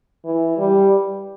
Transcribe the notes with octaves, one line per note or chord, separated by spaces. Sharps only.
E3
G3